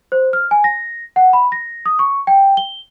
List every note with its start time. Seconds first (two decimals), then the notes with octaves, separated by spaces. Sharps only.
0.12 C5
0.33 F6
0.51 G#5
0.64 A#6
1.16 F#5
1.33 B5
1.52 A#6
1.86 D#6
1.99 C#6
2.27 G5
2.57 G7